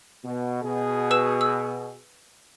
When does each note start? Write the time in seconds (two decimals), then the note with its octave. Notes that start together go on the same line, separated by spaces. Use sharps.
0.24 B2
0.63 B2 G#4
1.11 B4 E6 E7
1.41 E6